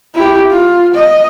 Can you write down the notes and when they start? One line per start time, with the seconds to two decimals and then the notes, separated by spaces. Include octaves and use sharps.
0.14 E4 G4
0.51 F4
0.94 D#5